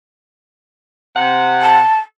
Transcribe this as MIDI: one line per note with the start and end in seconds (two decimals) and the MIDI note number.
1.16 1.79 48
1.16 1.79 78
1.61 1.98 81